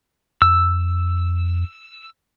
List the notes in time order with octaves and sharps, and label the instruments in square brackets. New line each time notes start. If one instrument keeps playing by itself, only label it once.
[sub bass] F2 [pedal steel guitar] E6